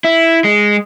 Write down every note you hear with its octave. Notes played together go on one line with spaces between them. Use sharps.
E4
G#3